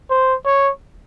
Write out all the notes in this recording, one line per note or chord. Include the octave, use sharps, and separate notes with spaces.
C5
C#5